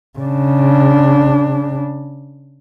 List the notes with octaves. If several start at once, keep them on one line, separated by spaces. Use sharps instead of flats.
C#3 D4